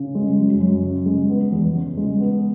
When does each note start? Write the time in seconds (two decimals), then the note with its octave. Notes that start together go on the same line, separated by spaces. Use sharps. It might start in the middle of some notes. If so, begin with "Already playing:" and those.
Already playing: C#3
0.15 G#3
0.38 F#2
0.60 F#2
0.83 C#3
1.06 G#3
1.30 B3
1.52 E2
1.75 C#3
1.97 G#3
2.20 B3